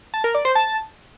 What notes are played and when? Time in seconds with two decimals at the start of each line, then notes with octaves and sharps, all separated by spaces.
0.14 A5
0.24 A#4
0.35 D5
0.45 C5
0.55 A5